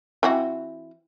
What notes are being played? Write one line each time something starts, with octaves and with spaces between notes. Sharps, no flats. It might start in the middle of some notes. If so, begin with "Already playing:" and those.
E3 C4 F#4